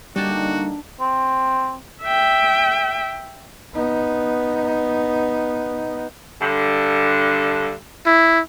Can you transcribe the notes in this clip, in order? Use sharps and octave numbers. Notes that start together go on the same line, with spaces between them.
D3 G3 A#3 D4 D#4 F#4 G5 A5
C4
E5 G5
B3 D#4
G2 D3
E4